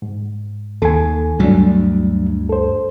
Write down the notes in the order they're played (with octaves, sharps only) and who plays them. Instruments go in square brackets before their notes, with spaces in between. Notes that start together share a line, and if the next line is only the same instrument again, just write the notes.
[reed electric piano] G#2
[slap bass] D#2 [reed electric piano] A4 G#5
[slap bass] D2 G2 A3 [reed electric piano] F#3 D4
[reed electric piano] A4 C5